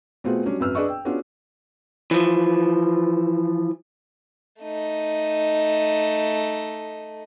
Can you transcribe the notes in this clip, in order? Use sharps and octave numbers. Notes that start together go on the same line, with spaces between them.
B2 A3 B3 C4 F4 G#4
F#3 G3 C#4 D4
G#1 F#2 B4 E6 F6
D4 G#4 B4 D5 D#5 C#6
G5
B3 C#4 D4 F4 F#4 G#4
E3 F3
A3 D#4